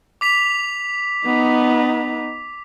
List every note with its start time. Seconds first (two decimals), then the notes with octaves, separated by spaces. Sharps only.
0.21 D6 B6 F7
1.26 B3 D#4